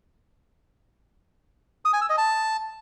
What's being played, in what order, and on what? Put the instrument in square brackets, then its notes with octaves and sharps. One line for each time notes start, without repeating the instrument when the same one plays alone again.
[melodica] D#6
G#5
E6
D#5
A5